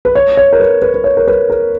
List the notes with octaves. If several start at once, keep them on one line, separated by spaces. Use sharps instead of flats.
B4
C#5
C#5
A#4
B4
B4
B4
C#5
A#4
B4
A#4